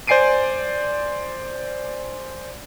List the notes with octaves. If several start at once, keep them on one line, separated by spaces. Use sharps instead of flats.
C5 D5 G#5 C7 D7 D#7